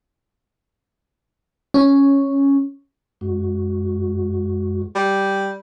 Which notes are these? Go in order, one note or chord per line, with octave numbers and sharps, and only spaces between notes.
C#4
F#2 G#3 F#4
G3